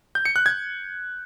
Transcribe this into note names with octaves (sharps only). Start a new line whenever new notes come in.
G6
C#7
F#6
G#6